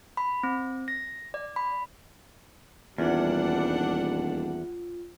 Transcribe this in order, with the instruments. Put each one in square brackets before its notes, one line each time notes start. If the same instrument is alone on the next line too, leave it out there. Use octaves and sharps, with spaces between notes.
[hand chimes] B5
C4
A#6
D5
B5
[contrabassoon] D#1 [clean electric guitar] E2 [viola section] G3 D4 F#5 [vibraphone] F4